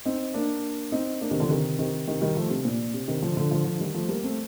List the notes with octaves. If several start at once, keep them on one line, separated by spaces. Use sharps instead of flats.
C4 D#4
A#3 D4
C4 D#4
A#3 D4
C3 D#3
D3 F3
C3 D#3
C3 D#3
C3 D#3
D#3 G3
F3 A3
C3
A#2
C3
C3 D#3
D3 F3
D3 F3
D3 F3
D3 F3
D#3 G3
F3 A3
G3 A#3
A3 C4